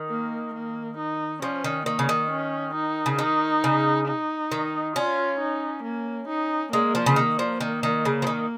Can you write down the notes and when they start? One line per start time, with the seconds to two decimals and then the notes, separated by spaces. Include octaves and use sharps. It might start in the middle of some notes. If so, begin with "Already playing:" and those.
Already playing: D#3
0.09 A#3
0.54 A#3
0.98 D#4
1.42 F3 C#4
1.64 D#3
1.86 D#3 A#3
1.99 C#3
2.09 D#3
2.31 C#4
2.74 D#4
3.06 C#3
3.19 D#3 D#4
3.64 C#3
4.08 D#4
4.52 D#3
4.96 C#4 F4
5.40 D#4
5.84 A#3
6.28 D#4
6.73 G#3 A#3
6.95 F3
7.06 C#3
7.16 D#3 A#3
7.39 F3
7.61 D#3
7.83 D#3
8.05 C#3
8.22 F3
8.27 D#3